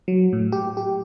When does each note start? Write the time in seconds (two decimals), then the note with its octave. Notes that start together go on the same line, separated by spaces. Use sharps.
0.08 F#3
0.33 A2
0.52 G4
0.77 G4